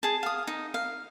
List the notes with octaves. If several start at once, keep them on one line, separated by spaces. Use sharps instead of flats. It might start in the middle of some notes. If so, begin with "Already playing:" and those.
G#4 A5
F5 D#6
D#4
F5